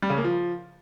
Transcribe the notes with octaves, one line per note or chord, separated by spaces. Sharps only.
G3
C#3
A#3
F3